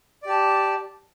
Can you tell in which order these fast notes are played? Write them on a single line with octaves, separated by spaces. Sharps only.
D5 G4 A5